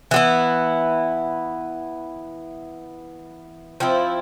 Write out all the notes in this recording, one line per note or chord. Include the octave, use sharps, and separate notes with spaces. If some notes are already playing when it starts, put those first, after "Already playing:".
E3 B3 E4
F3 C4 E4